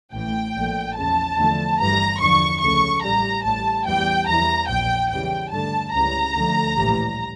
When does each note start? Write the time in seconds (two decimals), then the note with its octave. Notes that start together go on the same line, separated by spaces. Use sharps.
0.13 A1 A2 E3 G5
0.55 A#1 A#2 F3 A3
0.96 E2 C#3 F3 A5
1.38 E2 D3 F3 A3
1.79 G1 G2 E3 G3 A#5
2.20 E2 D3 F3 C#6
2.62 C#2 C#3 F3 A3 C#6
3.03 A1 A2 G3 A#5
3.44 A1 A2 G3 A5
3.86 E2 E3 G3 G5
4.28 E2 E3 G3 A#5
4.69 A#1 A#2 F3 G5
5.10 E2 C#3 E3 G3 G5
5.52 G2 D3 A3 A5
5.93 C#2 C#3 E3 G3 A#5
6.35 D2 D3 F3 A3
6.76 A#1 A2 E3 G3